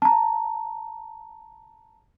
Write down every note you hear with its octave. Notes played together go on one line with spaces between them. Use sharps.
A5 A#5